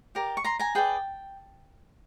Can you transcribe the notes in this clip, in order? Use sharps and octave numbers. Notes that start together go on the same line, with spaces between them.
G4 A#4 D5
C#6
A#5 C6
G#5 A#5
G#4 B4 D5 G5 A5